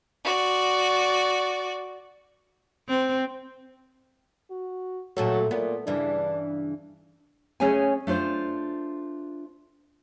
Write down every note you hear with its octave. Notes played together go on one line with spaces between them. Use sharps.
F#4 D5
C4
F#4
A#2 F#3 A3 A4
A#2 B3
G2 C#3 E3 D4
A3 C#4 G#4 C#5 D#5 G#5
A3 D4 F4 C5